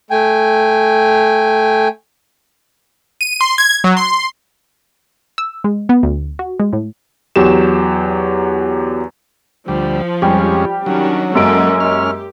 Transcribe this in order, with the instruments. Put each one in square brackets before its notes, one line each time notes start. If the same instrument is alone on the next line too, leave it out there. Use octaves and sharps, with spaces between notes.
[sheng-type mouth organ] A3 G5 G#5
[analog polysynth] D#7
C6
G#6
F#3
C6
[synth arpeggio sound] E6
G#3
B3
D2
F#4
G#3
A2
[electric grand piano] E2 F#3 G4 E7
[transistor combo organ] D2 G3 [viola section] F3
[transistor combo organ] F2 G#3 C#4 [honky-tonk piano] G3 G4
[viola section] D#3 C#4 D4 [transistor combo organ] F#3
[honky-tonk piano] F#2 G#3 D7 [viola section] A#3 C#4 A4
[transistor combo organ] C#4 F6 [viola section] G4